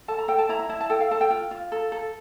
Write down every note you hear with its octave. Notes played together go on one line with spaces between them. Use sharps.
A4 A5
A#5
A4 G5
A5
E4 A#5
A#5
E4 A5
A5
A4 G5
F5
A4 A5
G5
F4
F4
A4
A4